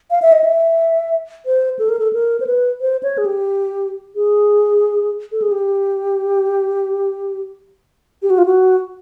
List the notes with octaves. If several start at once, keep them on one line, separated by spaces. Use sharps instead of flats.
F5
E5
D#5
E5
C5
A4
A#4
A4
A#4
C5
B4
C5
C#5
G#4
G4
G#4
A4
G#4
G4
G4
F#4
F4
F#4